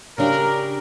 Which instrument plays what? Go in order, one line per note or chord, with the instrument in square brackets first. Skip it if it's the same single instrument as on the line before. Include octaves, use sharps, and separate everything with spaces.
[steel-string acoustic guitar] C#3 D4 G4 [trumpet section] A#4